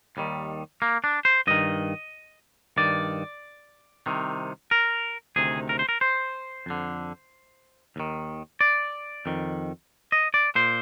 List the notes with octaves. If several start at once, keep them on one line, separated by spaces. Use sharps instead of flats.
D#2 D#3 G3
A#3
D4
C5
G2 D#3 D#5
G2 D#3 D5
C2 C3 D#3
A#4
D2 C3 D#3 G#4
A#4
C5
A#4
C5
F2 D3
D#2 D#3
D5
F2 D#3
D#5
D5
A#2 C5